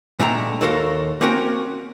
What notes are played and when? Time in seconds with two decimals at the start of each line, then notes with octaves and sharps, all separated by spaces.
0.19 A#2 D3 G#3 A3 G5 A#5
0.61 D#2 F#4 A4 A#4 F5 C6
1.21 A#3 C4 C#4 F#4 A#4 G5